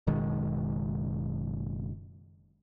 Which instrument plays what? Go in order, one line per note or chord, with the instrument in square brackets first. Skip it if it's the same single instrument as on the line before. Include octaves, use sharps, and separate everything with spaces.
[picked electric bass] F#1 B2 D#3 G#3